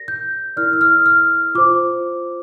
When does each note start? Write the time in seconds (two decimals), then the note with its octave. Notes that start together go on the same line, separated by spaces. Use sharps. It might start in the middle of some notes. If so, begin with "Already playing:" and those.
Already playing: G4 A#4 D5 A#6
0.08 G6
0.56 E4 A#4 D5 F6
0.73 E6
0.81 F6
1.06 F6
1.55 F4 C5 D6